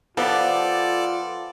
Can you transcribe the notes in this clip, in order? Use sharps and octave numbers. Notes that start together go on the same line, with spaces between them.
F3 B3 F4 G4 A4 D5